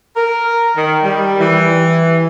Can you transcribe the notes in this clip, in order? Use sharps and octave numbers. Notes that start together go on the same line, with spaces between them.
A#4
D#3
G3
E3